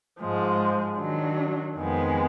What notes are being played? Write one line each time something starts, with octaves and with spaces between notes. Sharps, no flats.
G#2 F3 G#3
D#3 F#3 D4
F2 D#3 G#3 B3